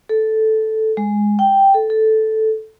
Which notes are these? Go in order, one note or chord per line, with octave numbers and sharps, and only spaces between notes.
A4
G#3
G5
A4
A4